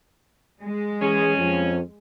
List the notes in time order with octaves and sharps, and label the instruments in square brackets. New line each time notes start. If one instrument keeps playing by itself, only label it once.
[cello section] G#3
[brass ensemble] E3 G#4 [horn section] C#4
[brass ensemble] F2